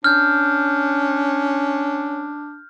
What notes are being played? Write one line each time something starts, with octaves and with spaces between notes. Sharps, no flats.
C#4 D4 F6 G6